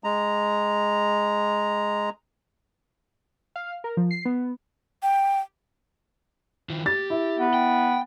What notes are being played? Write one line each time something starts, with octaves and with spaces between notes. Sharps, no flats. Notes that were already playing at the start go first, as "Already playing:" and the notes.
G#3 A#5
F5
A#4
F3
C7
B3
G5
D#3 E4 F4
G4 A6
E4
B3
G5